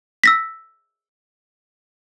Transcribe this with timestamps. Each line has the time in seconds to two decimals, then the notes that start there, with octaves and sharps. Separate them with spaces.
0.24 E6 A#6 B6